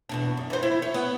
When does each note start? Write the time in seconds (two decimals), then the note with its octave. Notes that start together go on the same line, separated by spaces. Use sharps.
0.09 E2 B2 D4
0.37 F#2
0.50 E3 C5
0.63 E4
0.82 C#5
0.94 B3